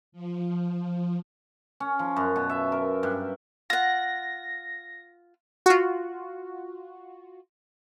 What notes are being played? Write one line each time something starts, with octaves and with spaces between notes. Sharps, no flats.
F3
C#4
F3
F#2
B2
E5
A#4
G2
F4 F#5 A#6
F4 F#4